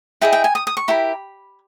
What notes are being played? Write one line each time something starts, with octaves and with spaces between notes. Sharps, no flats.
E4 G#4 D#5 G5
G5
G#5
D#6
D#6
C#6
E4 G4 A#4 B5